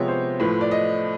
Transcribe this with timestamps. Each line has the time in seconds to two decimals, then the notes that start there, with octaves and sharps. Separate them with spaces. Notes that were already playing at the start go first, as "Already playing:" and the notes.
Already playing: C3 F3 G#3 B3 C#5
0.08 C5
0.40 A2 F3 A3 B4
0.61 D5
0.71 D#5